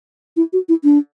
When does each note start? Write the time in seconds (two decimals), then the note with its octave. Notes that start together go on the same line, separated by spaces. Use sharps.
0.37 E4
0.53 F#4
0.69 E4
0.84 D4